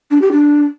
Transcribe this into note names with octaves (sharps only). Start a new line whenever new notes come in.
D4
G4
D4